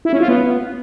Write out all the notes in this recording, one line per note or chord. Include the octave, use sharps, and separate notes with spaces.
E4
C#4
F4
B3